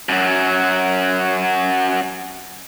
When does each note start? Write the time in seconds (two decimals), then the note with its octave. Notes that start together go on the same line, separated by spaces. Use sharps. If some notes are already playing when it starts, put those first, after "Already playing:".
0.09 F#2 F#3